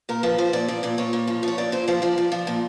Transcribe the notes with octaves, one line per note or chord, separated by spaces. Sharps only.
A#2 A#4
F3 B4
F3 C5
A#2 D5
F3 D5
A#2 D5
A#2 C#5
A#2
F3
F3 C#5
A#2 D5
A#2 C5
F3 C5
F3 D5
F3
F3
A#2